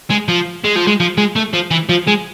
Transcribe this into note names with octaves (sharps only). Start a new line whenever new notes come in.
G#3
F3
G#3
F3
G#3
F3
G#3
A3
F3
E3
F3
G#3